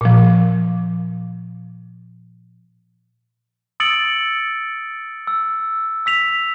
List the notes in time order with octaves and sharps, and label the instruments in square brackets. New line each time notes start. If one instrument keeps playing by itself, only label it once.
[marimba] A#2 F3
[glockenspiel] D#6 E6 A6 C#7 D7 F#7
E6
E6 B6 F7